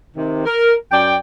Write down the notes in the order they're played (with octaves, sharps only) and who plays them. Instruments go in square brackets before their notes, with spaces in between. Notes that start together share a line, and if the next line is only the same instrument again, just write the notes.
[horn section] C3 D#3
A#4
F#2 D5 G5